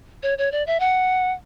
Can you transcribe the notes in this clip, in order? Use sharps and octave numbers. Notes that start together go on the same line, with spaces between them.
C#5
C#5
D5
E5
F#5